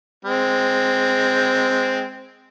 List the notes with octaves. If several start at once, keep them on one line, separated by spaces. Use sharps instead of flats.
G#3 C4